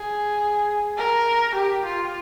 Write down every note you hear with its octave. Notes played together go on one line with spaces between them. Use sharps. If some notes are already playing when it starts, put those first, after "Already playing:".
Already playing: G#4
A#4
G4
F4